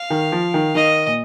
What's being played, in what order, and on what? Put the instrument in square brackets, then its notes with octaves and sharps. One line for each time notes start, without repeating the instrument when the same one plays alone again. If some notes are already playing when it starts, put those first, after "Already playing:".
Already playing: [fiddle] F5
[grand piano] D#3
F3
D#3
[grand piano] D#3 [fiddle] D#5
[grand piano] A#2